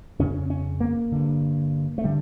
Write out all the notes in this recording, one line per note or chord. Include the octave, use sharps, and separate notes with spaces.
F2 C#3 C#4
C#4
A#3
G2 D3
A3
D3 G3